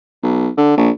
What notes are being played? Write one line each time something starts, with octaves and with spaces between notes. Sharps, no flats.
B1
D3
A#1